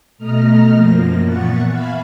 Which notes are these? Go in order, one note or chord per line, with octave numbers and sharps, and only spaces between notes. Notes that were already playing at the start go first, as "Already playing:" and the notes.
B2 A3 D#5 A#5 F6
F#2 F3 A#3 A#6
A#2 E3 B3 F#5 C#6 A6
E5 F5 G#5 B5 F6